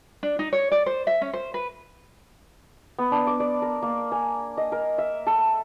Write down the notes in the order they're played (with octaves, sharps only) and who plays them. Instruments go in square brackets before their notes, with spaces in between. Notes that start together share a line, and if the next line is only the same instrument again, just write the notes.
[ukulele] D4
D#4
C#5
D5
C5
E5
C#4
C5
B4
[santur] B3
D4
D6
D5
A#4
A#3
G#5
D#5
A#4
E5
A4